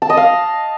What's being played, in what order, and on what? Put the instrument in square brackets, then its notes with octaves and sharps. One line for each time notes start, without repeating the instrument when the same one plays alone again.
[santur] A5
D#5
F5